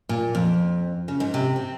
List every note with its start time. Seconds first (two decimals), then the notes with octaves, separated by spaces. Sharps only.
0.09 A#2
0.35 F2
1.08 C#3
1.20 G#2
1.34 C3
1.56 C4